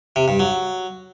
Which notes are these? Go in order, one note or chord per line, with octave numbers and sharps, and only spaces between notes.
C3
G2
F#3